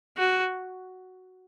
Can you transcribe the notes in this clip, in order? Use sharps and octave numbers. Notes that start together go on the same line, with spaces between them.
F#4